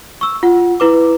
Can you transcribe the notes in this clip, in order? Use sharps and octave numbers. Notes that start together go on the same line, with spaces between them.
C#6 E6
F4 F#5
E4 B4 D6